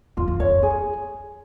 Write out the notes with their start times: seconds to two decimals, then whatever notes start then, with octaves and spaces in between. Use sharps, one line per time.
0.17 F2 F4
0.28 E2
0.40 F2 C#5
0.63 G#4